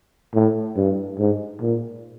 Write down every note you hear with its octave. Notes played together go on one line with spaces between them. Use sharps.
A2
G2
G#2
A#2